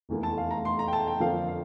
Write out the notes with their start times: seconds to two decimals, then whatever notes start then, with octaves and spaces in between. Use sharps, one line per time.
0.09 F1 E2 E3 A#3
0.23 A5
0.38 F5
0.51 A#5
0.65 C6
0.79 A#5
0.88 G5
0.93 A5
1.07 G5
1.20 F2 D3 F3 A#3 F5
1.48 F5